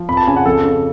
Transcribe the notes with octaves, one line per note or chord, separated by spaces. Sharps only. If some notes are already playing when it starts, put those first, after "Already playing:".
Already playing: F3
F2 B5
A5
C#3 G#5
F#5
F2 A4
C#3